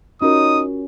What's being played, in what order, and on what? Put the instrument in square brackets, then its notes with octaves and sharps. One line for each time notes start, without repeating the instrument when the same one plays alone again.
[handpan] C#4 [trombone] D#4 [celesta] F4 F#4 A#4 [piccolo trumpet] D#6